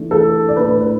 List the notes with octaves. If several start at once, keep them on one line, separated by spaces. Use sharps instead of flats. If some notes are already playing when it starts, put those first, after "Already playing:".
Already playing: E3 A3 D4
A4
D5
A2 A3 D4 B4
B4